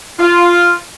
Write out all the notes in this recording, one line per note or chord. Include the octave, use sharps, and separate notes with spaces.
F4